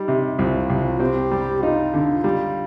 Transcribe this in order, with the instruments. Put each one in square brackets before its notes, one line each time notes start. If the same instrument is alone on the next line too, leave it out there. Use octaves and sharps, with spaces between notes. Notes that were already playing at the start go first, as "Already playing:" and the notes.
Already playing: [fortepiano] G3 [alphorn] D#4
[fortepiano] C3
[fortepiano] C2 [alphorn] F4
[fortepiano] C2
[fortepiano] C4 [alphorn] G4
[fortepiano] G3
[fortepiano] D#4 [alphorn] F4
[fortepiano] D3
G3